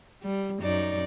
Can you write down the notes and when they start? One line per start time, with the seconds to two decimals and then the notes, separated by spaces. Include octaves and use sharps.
0.22 G3
0.60 F#2 D#4 D5